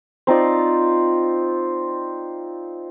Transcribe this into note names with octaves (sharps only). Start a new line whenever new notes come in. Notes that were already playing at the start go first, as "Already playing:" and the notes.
C4 D#4 F4 D5